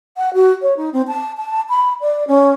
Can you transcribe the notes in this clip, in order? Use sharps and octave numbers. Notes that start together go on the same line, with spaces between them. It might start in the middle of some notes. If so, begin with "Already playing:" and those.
F#5
F#4
C#5
D#4
C4
A5
A5
B5
D5
C#4